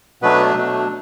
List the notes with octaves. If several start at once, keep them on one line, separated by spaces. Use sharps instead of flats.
B2 F#3 A3 B3 D4 B4
B2 F#3 A3 D4